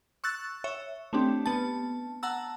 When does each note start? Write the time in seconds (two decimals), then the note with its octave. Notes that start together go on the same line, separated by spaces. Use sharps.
0.24 C#6 E6 F#6 A6
0.64 C#5 E5
1.13 A3 C4 D4 G4
1.46 B3 A5
2.23 F#5 A5 A#5 E6